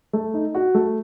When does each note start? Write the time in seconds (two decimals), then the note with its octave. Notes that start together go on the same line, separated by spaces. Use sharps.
0.13 A3
0.34 D#4
0.55 F#4
0.75 A3